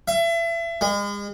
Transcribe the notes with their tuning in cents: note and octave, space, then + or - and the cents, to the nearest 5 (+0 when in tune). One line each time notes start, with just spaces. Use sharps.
E5 +35
G#3 -40